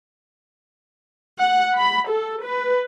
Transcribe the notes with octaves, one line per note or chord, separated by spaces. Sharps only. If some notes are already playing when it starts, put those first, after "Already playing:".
F#5
B5
A4
B4